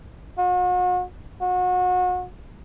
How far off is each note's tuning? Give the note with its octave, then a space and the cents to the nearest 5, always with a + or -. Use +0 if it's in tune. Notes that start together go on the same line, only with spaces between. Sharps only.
F#4 -40
F#4 -30